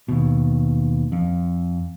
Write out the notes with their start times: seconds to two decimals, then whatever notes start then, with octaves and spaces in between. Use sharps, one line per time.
0.08 D#2 B2
1.12 F2